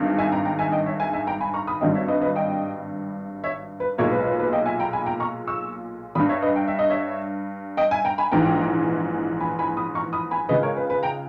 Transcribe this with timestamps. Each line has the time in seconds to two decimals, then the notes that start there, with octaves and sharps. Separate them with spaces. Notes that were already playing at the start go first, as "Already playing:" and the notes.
Already playing: G#1 G2 D#3 G#3
0.18 E5 G#5
0.32 G5 A#5
0.45 G5 A#5
0.59 E5 G#5
0.72 D#5 G5
0.86 C#5 E5
1.00 E5 G#5
1.13 E5 G#5
1.27 G5 A#5
1.41 G#5 B5
1.54 A#5 C#6
1.67 B5 D#6
1.81 G#1 G2 G3 D#5 G5
1.95 C#5 E5
2.08 B4 D#5
2.21 B4 D#5
2.36 D#5 G5
3.44 C#5 E5
3.80 B4
3.98 B1 A#2 G#3 A#4 C#5
4.12 B4
4.25 B4
4.39 B4
4.53 D#5 G5
4.66 E5 G#5
4.80 G5 A#5
4.93 G#5 B5
5.06 G5 A#5
5.20 A#5 C#6
5.47 C#6 E6
6.15 G2 G3 B5 D#6
6.29 C#5 E5
6.42 B4 D#5
6.56 G5
6.68 E5
6.79 D#5
6.90 C#5 E5
7.77 D#5 G5
7.91 E5 G#5
8.05 G5 A#5
8.18 G#5 B5
8.32 A#1 G#2 E3 G#3 G5 A#5
9.40 G#5 B5
9.59 G#5 B5
9.77 B5 D#6
9.95 A#5 C#6
10.13 B5 D#6
10.31 G#5 B5
10.49 C#2 C#3 G#3 B4 D#5
10.62 A#4 C#5
10.77 B4
10.90 B4
11.03 G5 A#5